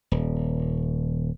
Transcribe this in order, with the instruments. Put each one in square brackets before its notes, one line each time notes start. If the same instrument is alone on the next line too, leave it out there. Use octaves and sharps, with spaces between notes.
[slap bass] D#1